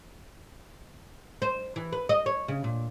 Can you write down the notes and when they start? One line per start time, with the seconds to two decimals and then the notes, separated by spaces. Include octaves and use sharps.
1.42 C5
1.76 E3
1.93 B4
2.09 D#5
2.26 C#5
2.48 C#3
2.64 A#2